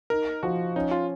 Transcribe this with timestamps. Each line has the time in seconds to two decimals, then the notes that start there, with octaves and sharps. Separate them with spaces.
0.10 D#4 A#4
0.43 F3 F#4
0.76 C#4 D#4
0.91 F4